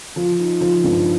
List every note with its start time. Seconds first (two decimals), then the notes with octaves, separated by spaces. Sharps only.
0.16 F3
0.39 D#4
0.61 F3
0.84 G2